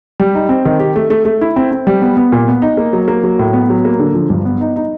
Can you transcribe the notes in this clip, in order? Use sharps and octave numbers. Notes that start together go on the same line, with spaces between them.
G3
D#4
C4
D#3
G4
A3
A3
A3
E4
C4
C4
G3
B3
B3
A#2
B3
D#4
A#3
F#3
A#3
F#3
A2
B3
F#3
A#3
D3
F3
G2
B3
D#4
D#4